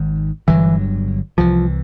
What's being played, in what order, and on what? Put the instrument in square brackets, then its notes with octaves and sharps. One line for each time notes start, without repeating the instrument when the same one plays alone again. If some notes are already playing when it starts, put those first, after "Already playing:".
Already playing: [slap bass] G#1 G#2 D#3
[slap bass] G1 G2 D3 F#3 [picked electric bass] E3
[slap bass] C2 C3 E3 [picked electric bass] F3